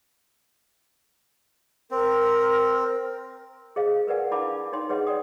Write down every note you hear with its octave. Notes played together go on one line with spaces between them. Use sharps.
C4 A#4
G#4 C5 D#5 F5
A#4 B4 D5 F#5 G#5
D4 E4 F5 A5 B5 D6
D#4 C#5 G5 C6
G#4 B4 C#5 D#5 F#5
D5 G5 D#6